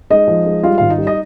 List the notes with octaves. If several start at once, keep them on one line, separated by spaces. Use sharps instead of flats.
G#3 D#4 D#5
F3
G#3
G3 F4 F5
G#1 F5
D#4 D#5
G3
D#5